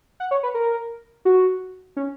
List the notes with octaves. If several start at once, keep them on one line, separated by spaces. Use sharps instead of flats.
F#5
C#5
B4
A#4
F#4
C#4